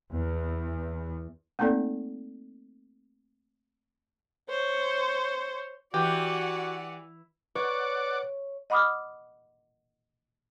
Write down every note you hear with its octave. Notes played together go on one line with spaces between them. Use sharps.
E2
A3 A#3 C4 D#4 A4 D5
C5 C#5
E3 F#4 G4 D5 F#5
B4 C#5 D5 F#5 D6
D#5 F#5 B5 D6 D#6 F6